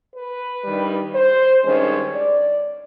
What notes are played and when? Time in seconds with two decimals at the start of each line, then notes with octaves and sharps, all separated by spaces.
0.15 B4
0.65 G2 D#3 G3
1.14 C5
1.64 G2 D#3 G#3 C#4 C#5
2.14 D5